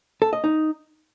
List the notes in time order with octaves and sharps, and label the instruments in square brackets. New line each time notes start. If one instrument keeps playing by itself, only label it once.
[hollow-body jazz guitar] A4
D#5
D#4